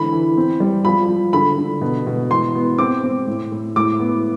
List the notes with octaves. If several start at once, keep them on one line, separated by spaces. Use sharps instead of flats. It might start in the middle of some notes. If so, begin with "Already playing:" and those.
Already playing: D3 E3 B5
E3
C4
G3
F3 B5
F3
D3 B5
D3
B2
B2
E3 C6
B3
C4 D6
C4
A2
A2
A2 D6
B3